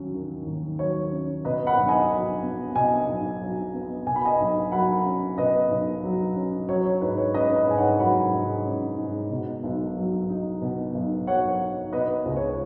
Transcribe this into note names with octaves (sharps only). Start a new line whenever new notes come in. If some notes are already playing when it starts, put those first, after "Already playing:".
Already playing: D#2 F#3 C#4
D#3
D#2
F#3 C#5
C#4
B2 B4 D#5
F#5 B5
B1
D#5 G#5
F#3
B3
B2 D#5 G#5
B1
F#3
B3
B2 G#5
B5
D#5 G#5
B1
F#3 F#5 B5
C#4
B2 B4 D#5
B1
F#3
C#4
F#3 C#5
C#5
G#2 B4
C#5
C#4 B4 D#5
B4 D#5
G#2 G#5
C#5 F#5
F#3 F#5 B5
G#2
C#4
G#2
B2
B1
F#3
D#4
B2
B1
F#3 C#5 F#5
D#4
B2 B4 D#5
C#2
C#5